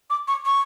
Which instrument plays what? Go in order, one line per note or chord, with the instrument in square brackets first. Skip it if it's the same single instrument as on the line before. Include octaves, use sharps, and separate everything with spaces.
[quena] D6
C#6
C#6